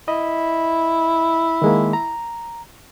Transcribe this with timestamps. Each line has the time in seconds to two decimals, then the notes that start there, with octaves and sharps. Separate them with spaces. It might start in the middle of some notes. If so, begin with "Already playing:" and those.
0.08 E4 D#5
1.62 D#3 G#3 A#3
1.93 A#5